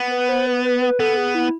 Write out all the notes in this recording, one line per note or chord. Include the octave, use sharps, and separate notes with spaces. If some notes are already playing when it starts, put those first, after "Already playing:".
Already playing: B3
B4
C5
B4
B4
B4
B3 A4
G#4
E4